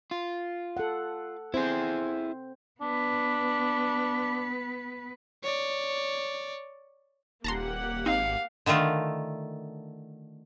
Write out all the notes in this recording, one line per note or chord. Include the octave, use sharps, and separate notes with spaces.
F4
A4 F#5
C4 E4 G#4 C5
B3 D4 B4
C#5 D5
D#1 A#3 G4 F#5 A5 A#5 C6
G#1 C4 D#4 F5
D3 D#3 A3 F4